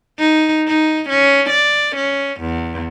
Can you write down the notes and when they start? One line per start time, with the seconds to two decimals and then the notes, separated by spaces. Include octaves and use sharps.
0.18 D#4
0.68 D#4
1.09 C#4
1.50 D5
1.96 C#4
2.41 E2